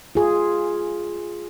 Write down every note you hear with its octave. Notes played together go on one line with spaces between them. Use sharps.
F4 G#4